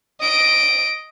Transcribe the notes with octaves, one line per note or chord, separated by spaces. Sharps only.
D#5 D7